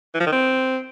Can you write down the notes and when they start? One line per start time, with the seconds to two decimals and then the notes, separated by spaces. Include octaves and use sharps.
0.14 E3
0.20 F3
0.26 D#3
0.32 C4